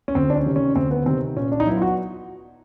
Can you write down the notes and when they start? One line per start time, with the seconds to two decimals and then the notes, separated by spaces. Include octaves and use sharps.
0.08 C#4
0.15 D2 C4
0.30 D4
0.36 C#4
0.46 C3 D#3
0.56 C#4
0.76 D2 C4
0.91 B3
1.06 C3 D#3 C4
1.36 A#2 C#4
1.52 D4
1.60 D#4
1.66 F#3 B3 E4
1.76 F4
1.82 F#4